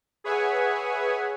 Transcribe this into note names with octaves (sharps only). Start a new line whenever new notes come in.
G#4 B4 C#5 E5 F#5 G#5